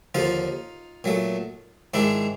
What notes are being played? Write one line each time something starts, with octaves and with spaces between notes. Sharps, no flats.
D#2 D3 F3 D#4 F4
A#2 F#3 A3
G#2 D#3 G#3 D4 E4